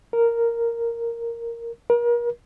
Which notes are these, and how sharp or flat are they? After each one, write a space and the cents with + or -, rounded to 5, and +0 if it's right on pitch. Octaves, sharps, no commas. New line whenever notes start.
A#4 -5
A#4 +35